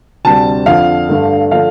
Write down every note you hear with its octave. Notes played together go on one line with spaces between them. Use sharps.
D2 C3 G3 A5
F2 D3 F3 F5
G2 D3 A3
D3 F3 A3 F5